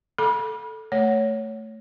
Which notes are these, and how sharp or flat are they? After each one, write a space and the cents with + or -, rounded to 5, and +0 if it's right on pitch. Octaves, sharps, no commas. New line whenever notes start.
A4 -5 B5 -30 D6 +0
A3 +0 C#5 +5